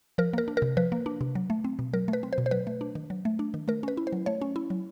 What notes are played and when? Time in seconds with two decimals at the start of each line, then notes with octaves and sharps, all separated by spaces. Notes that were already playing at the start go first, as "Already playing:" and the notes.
0.18 F3 A#4
0.33 A#3 A#4
0.48 D4
0.57 A#4
0.62 C3
0.77 F3 B4
0.92 A#3
1.06 D4
1.21 C3
1.35 F#3
1.50 A3
1.64 C4
1.79 B2
1.93 F#3 A#4
2.08 A3
2.13 B4
2.23 C4
2.33 C5
2.38 B2
2.46 C5
2.51 F#3 B4
2.67 A3
2.81 D4
2.95 D#3
3.10 F#3
3.25 A3
3.39 D4
3.54 D#3
3.68 A3 A#4
3.83 C#4 B4
3.97 E4
4.07 C5
4.13 F#3
4.26 A3 C#5
4.41 C#4
4.56 E4
4.70 F#3